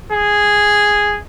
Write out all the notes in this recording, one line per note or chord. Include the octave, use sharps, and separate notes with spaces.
G#4